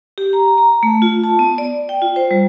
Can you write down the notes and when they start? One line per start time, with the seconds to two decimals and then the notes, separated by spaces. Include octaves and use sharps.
0.18 G4
0.33 A#5
0.58 A#5
0.83 A3
1.02 F4
1.24 A5
1.39 B3
1.58 D5
1.89 G5
2.02 F4
2.16 C5
2.31 G3